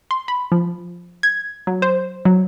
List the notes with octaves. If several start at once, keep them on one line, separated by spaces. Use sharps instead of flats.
C6
B5
F3
G#6
F#3
C5
F#3